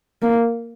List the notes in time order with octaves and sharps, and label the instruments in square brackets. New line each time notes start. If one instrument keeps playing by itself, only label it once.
[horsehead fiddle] A#3